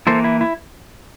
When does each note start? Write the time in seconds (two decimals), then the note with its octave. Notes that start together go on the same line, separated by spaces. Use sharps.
0.07 E3 A#3 E4 A4 C5
0.24 E4
0.41 E4